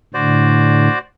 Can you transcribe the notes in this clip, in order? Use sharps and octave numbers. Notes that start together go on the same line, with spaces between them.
A2 D3 F#4 C5 D5